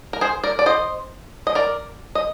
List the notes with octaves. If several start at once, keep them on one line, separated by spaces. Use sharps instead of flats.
A#4
G#4 C5
A#4 D5
D5
C5 D#5
D#5
A#4 D5
D#5